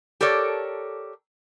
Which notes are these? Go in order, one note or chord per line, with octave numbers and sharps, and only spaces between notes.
G4 A4 A#4 C#5 D5